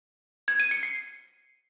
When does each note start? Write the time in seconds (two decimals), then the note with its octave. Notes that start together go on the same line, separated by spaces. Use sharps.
0.48 G#6
0.60 D#7
0.71 C#7
0.83 C7